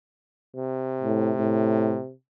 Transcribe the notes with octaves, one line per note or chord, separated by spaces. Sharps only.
C3
A2
A2